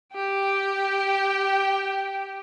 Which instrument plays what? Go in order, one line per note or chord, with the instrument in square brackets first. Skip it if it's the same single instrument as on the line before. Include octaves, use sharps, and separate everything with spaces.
[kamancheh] G4 G5